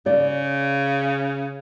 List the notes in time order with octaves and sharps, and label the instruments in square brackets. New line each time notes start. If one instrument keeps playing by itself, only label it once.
[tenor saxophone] C#3 [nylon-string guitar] D5